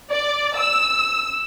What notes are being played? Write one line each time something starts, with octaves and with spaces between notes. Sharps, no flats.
D5
E6